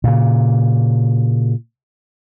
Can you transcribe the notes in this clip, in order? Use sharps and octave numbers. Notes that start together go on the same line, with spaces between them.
A#2 C#3